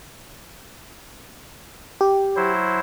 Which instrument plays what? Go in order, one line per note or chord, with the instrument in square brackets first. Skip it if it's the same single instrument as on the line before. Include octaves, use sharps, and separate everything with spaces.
[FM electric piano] G4
[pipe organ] F#3 E4 C5